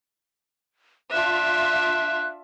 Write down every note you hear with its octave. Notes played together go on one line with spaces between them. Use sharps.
D4 F4 E5 F#6